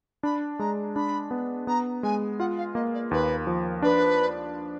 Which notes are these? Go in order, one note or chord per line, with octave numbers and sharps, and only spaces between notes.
D4 B5
G#3 A#5
D4 B5
B3
B3 A#5
G#3 G#5
F4 F#5
F5
A#3 D#5
D5
D#2 B4
F3
D4 B4